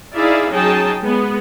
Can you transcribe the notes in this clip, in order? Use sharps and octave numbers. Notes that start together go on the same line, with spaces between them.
D#4 E4 G#4 D5 E5 F5
F#3 C#4 D#4 G#4 G5 A5
G#3 B3